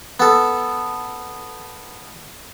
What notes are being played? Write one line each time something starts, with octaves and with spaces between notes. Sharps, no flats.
B3 A4